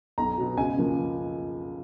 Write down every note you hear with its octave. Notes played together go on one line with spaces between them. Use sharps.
B1 A#5
B2 F#3
C#2 G#5
C#3 F3 A#3